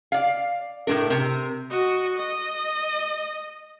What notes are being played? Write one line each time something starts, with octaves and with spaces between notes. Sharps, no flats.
D5 F5
A2 A3 D4 A#4
C3 A#4
F#4 D#5
D#5